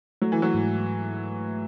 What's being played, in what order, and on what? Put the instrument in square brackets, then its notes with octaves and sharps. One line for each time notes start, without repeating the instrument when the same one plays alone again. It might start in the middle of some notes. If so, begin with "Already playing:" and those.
[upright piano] F#3 [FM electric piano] A3
[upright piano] E3
F#3
[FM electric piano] G#2